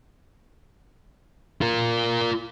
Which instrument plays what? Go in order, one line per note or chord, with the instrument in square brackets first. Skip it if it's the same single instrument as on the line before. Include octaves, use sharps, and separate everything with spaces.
[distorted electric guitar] F4 A#4